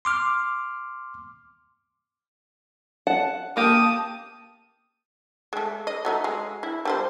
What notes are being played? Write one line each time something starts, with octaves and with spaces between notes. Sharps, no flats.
C6 D6 F6
F#5 A5
A#3 G4 A5 D#6
G#3 A3
D#5
F#3 A3 D#4
G#3
E4
G3 A4 C5